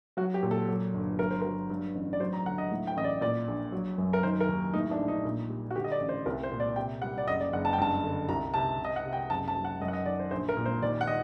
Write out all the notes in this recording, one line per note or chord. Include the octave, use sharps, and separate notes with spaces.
F#3 F#4
G4
A#2
A4
F#3
G1
F#3 A#4
C5
F#3 A#4
G2
A1
D5
F#3 C5
A#5
D2 F#5
D#5
A2
G5
A1 D#5
D5
A#2 D5
A#1
F#3
F#2
A#4
D#3 C5
A#4
D#2
A2 D#4
D4
A#1
D#4
A#2
G3
F#4
D3 G4
D#5
D5
A1
C5
C2 A#4
C5
A#2
D5
C3 G5
G3 F#5
D5
F#1 D#5
D5
F#1 F#5
A5
G5
G2 A5
D3
C2 A#5
C3 A5
C3 D#5
F#5
C3
G5
F#1 A5
A5
F#3
F#5
F#2 D#5
F#5
D#5
D#3 D5
C5
A#1 C5
A#4
A#2
C5
D#2 D5
F#5
D#3 D#5